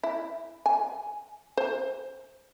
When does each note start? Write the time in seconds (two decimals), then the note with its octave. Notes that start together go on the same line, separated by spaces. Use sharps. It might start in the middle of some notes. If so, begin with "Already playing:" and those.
0.03 E4
0.66 G#5
1.57 C5